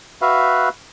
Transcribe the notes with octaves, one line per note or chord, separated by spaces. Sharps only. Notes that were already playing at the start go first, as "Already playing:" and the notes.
F#4 B4 E5 F5